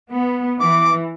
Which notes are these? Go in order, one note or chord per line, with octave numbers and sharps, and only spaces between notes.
B3
E3 D6